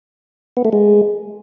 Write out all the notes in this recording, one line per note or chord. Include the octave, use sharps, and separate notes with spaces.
B3
A3
G#3